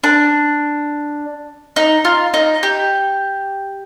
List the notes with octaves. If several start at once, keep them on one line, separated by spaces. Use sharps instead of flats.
D4
D#4
F4
D#4
G4